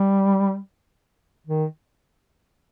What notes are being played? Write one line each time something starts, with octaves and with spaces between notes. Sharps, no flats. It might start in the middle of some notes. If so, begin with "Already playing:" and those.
Already playing: G3
D#3